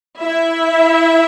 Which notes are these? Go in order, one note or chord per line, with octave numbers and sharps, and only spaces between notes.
E4 E5